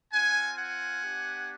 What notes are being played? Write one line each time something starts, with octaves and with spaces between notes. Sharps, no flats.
C4 F4 F#5 G#5
F#5 G#5
B3 D4 G4